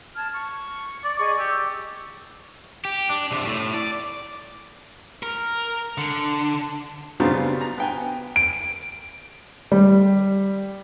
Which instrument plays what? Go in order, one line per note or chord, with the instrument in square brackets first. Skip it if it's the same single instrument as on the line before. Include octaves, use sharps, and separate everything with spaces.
[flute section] A5 F6 G#6
C#6
[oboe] D5
[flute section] G#4 D5 D#5 [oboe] C#6
[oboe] G4 [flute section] E6
[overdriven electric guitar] G4
D4
C3 D4
A2
D5
[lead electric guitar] A#4
D3
[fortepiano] C#3 F#3 G3 B3 C4 F4
A#5
B3 G5 G#5
[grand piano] D7
G3